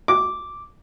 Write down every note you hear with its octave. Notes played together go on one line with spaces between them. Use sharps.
D6